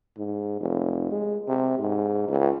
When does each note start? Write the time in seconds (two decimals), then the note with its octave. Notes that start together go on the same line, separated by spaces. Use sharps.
0.18 G#2
0.60 F1
1.11 G#3
1.48 C3
1.79 G#2
2.28 C#2